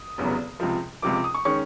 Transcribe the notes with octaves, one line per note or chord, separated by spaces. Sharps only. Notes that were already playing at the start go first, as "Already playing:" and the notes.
Already playing: D#6
F1 E2 C#3 F#3 B3
C#2 C3 F3
C#2 C3 F3 D6
D6
D#6
C#6
D#3 G#3 C#4 C#6